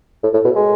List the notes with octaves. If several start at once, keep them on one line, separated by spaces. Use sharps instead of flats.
A2
A2
B2
G#3